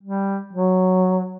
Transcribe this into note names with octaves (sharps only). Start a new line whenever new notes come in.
G3
F#3